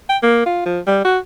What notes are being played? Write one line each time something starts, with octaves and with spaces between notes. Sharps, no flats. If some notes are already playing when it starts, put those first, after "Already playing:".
G5
A#3
F4
F3
G3
F#4